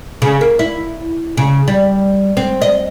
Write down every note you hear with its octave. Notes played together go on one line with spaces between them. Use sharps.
C#3
A#3
E4
C#3
G3
C4
D#5